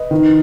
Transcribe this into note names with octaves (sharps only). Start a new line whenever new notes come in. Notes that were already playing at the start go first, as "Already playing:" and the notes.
Already playing: B4 D#5
D#3